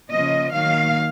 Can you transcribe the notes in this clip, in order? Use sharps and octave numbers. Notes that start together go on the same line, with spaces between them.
C#3 F3 A#3 D#5
D#3 F#3 A#3 F5